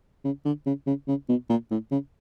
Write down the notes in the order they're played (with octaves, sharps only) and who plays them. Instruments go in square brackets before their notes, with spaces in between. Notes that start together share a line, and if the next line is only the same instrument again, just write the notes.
[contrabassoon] C#3
D3
C#3
C#3
C#3
B2
A#2
A2
C#3